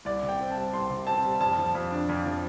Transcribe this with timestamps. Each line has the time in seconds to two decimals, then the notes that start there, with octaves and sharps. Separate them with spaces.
0.05 C2 D5
0.23 C3
0.29 G5
0.40 C4
0.51 A5
0.56 G3
0.73 C2 C6
0.90 C3
1.07 C4 A5
1.25 G3
1.41 F2 A5
1.58 F3
1.75 F2
1.92 D4
2.09 F2
2.25 F3